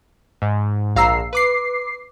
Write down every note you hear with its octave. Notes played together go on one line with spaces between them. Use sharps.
G#2
A#1 F5 A#5 E6 C7
B4 D6 C7